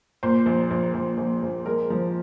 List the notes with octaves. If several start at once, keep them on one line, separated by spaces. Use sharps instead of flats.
A#2 C5
A#1
A#1
A#1
A#1
A#1
G#3 A#4
F3